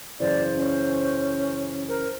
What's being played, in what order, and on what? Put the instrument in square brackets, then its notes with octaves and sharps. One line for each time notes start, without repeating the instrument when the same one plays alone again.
[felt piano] F#2 C#3 E3 [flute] C5 [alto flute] D5
[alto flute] C#4
[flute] A#4 [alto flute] C5